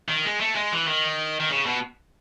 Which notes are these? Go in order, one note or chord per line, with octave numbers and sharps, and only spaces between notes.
D#3
G#3
A3
G#3
E3
D#3
D#3
C#3
B2